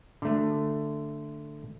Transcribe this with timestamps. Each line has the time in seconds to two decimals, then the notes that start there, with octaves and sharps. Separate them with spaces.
0.22 D3 A3